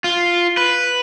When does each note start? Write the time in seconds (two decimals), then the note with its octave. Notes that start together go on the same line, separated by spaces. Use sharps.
0.04 F4
0.57 B4